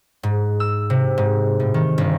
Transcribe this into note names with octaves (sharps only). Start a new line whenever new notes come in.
G#2
E6
C3
G#2
A2
D#3
G1